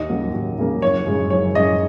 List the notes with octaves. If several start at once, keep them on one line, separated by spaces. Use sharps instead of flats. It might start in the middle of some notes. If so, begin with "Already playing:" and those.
Already playing: D#2 D#5
C#3 F#3 A#3
D#2
C#3 F#3 A#3
F#1 C#5
F#2 C#3 G#3
F#1 C#5
F#2 C#3 G#3 D#5